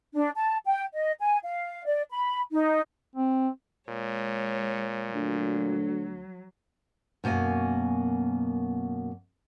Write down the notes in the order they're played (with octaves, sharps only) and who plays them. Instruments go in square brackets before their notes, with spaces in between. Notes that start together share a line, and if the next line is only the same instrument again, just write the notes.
[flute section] D4
A5
G5
D#5
G#5
F5
D5
B5
D#4
[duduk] C4
[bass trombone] A#2 [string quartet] G#3 C#5
[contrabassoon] D2 [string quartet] F#3
[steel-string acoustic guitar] F#2 B2 A#3 G#5